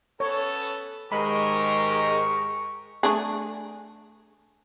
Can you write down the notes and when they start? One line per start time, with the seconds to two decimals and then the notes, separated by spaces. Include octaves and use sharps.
0.20 B3 C#4 A4 C#5
1.12 G#2 D#3 G#3 G4 A#4 B5 C#6
3.03 A3 D4 G#4